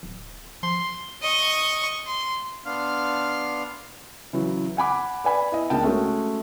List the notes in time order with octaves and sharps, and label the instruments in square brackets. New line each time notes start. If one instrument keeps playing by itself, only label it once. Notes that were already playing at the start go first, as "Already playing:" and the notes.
[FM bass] D1
[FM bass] F3 [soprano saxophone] C6
[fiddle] D#5 C#6
C6
[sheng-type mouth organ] B3 D4 F5 C6 F6
[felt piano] C#3 E3 F#3
F#5 G#5 B5 D6
B4 D5 G#5 B5
E4 D#5
C#2 A#3 D4 G5 A5
G#3 A3 C#4 F#4